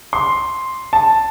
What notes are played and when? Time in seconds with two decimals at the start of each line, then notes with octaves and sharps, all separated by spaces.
0.13 C6
0.93 A5